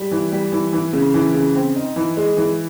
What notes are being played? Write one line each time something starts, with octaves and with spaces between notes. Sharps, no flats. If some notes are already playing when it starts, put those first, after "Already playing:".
Already playing: G3
E3
G3
E3
E3
C#3
E3
C#3
C4
D#4
E3
G#3
E3